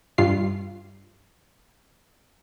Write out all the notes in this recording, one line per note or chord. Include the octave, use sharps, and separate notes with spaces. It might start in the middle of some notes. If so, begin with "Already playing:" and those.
G2 F4 C7